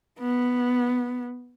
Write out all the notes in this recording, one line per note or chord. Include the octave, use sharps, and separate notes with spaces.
B3